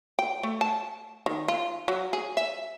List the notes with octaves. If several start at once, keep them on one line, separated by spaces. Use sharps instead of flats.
G5
A3
A5
D#3
F4
F#3
G#4
E5